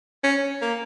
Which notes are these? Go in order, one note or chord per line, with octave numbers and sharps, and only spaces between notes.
C#4
A#3